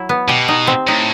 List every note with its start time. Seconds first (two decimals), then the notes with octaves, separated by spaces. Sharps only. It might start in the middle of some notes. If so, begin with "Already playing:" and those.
Already playing: F#3 E4
0.09 B3
0.28 B2 G4
0.48 D#4
0.67 C4
0.87 A2 D#4